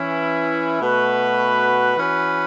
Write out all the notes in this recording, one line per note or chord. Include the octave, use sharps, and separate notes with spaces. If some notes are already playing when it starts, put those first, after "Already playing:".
Already playing: E3 C#4 E4
B2 A3 F#4 B4
E3 C#4 F#4 B4